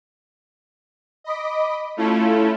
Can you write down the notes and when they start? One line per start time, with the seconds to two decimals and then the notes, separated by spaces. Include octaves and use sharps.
1.24 D#5 B5 D6
1.97 A3 C#4 E4 F4 A4